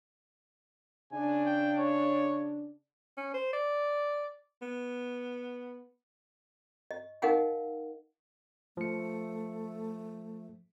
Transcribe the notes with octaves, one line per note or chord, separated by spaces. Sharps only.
C#3 D4 G#5
G5
C#5
C#4
C5
D5
B3
D#5
D#4 A#4 D#5 F5 F#5 G#5
F3 A3 C#7